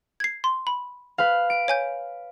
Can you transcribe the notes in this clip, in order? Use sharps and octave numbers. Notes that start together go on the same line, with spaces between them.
G#6 C7
C6
B5
B4 F5
D7
C#5 G#5 G6